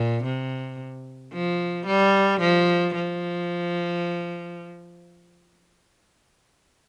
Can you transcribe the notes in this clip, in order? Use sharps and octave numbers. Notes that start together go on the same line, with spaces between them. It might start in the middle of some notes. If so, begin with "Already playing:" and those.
Already playing: A#2
C3
F3
G3
F3
F3